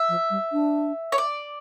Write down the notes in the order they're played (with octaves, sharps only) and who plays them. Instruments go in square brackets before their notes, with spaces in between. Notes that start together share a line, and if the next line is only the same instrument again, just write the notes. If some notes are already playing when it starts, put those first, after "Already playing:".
Already playing: [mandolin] E5
[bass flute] F3
G3
D4
[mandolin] C#5
D5